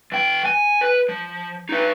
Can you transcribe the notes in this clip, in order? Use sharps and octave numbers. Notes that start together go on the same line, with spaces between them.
E3 G5
G#5
B4
F3
D#4 B4